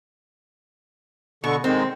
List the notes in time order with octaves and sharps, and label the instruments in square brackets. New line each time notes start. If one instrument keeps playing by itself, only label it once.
[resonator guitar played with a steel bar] B2 [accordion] D3 C#6
[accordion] D#3 G#3 [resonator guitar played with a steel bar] C4